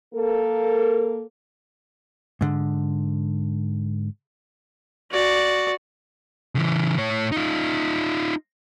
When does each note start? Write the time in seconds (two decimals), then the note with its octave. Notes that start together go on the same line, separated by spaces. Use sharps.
0.14 A#3 A4 A#4
2.41 G#2 D3
5.11 F#4 D5
6.55 C#3 E3
6.98 A2 C#5
7.32 D#4 F4